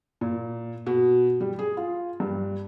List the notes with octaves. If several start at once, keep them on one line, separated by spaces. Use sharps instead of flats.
A#2
B2
G3
G#4
F4
G2